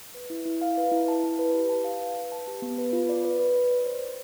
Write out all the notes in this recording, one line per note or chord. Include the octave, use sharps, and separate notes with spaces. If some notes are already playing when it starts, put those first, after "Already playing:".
B4
E4
E4
F5
B4
E4
A5
E4
B4
G4
A5
F5
B4
B4
A5
G4
B3
B4
F4
D5
B4
B4
D5
D5
C5
C5